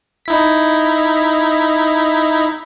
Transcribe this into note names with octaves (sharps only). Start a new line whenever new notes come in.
D#4 E4 B6